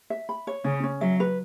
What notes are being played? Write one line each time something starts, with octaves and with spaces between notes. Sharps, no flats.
E5
B5
C#5
C#3 C#4
C#4
F#3 E5
B4